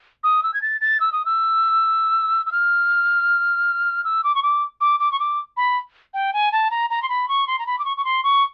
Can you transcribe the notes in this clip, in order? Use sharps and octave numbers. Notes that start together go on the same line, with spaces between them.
D#6
E6
G#6
A6
A6
E6
D#6
E6
E6
F6
E6
D6
C#6
D6
D6
D6
C#6
D6
B5
G5
G#5
A5
A#5
A#5
C6
B5
C#6
C6
A#5
B5
D6
C#6
C#6
C6
C#6